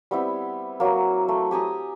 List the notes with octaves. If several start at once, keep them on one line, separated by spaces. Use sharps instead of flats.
G3 B3 C4 E4
F#3 A#3
A3
G4 G#5 A#5 D#6